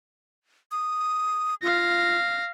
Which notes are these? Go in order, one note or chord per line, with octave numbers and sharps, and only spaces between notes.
D#6
F4 F5 A#6